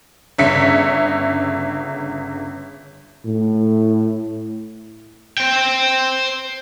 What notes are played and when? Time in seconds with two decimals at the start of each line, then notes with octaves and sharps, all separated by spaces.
0.38 G1 C#3 C#5 E5 B6 C#7
3.26 A2
5.38 C5 G5